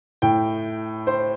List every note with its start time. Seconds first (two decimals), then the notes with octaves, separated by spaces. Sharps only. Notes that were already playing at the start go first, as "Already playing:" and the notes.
0.22 A2 G5
1.07 C5